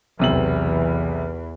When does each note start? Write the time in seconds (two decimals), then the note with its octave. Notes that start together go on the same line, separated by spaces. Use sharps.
0.19 B1 E2 C3 E3 F#7